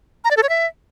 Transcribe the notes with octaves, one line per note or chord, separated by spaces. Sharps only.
A#5
D5
A4
C#5
E5